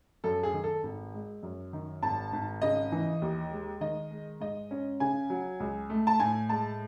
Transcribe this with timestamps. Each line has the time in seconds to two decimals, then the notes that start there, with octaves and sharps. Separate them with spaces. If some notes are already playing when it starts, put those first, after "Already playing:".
0.24 F#2 A4
0.43 G#4
0.54 D#3
0.64 A4
0.83 G#1
1.14 G#3
1.43 F#2
1.73 D#3
2.02 G#1 A5
2.33 G#1
2.62 C#3 D#5
2.92 E3
3.22 D#2
3.51 G#3
3.81 D#3 D#5
4.11 G#3
4.41 G#2 D#5
4.71 C#4
5.00 C#3 G#5
5.30 F#3
5.60 C#2
5.90 A3
6.07 A5
6.20 A2 G#5
6.49 G#3 A5